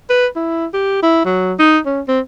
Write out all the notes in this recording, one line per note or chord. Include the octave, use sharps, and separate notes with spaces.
B4
E4
G4
E4
F#3
D#4
C#4
C4